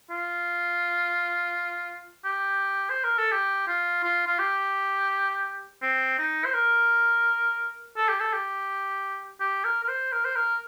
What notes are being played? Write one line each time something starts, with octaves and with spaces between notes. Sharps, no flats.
F4
G4
C5
A#4
A4
G4
F4
F4
F4
G4
C4
D#4
C5
A#4
A4
G4
A4
G4
G4
A#4
A#4
C5
A#4
C5
A#4